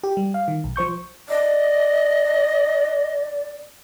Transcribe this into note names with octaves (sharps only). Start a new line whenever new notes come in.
G4
G3
F5
D#3
B1
F3 C5 C#6 G6
D5 D#5